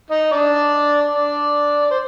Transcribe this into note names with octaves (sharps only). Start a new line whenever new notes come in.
D#4 D#5
D4 D5
D4 D5
C5